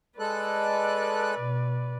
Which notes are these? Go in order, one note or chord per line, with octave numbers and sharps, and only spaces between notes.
G#3 A4 B4 D5 F#6
B2